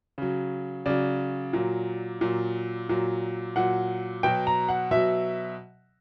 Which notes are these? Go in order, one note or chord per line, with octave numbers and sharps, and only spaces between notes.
C#3 F#3
C#3 F#3 D5
A#2 F#3
A#2 F#3
A#2 F#3
A#2 F#3 F#5
B2 F#3 G5
A#5
F#5
B2 F#3 E5